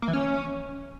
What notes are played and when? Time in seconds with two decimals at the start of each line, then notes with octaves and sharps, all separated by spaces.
0.02 A#3
0.08 E3
0.13 C#4